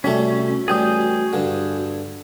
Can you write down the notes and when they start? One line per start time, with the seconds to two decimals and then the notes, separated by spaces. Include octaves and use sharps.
0.04 C3 G3 A3 C#4 F#4
0.68 A1 G3 G#4 G5 D#6
1.33 G2 D3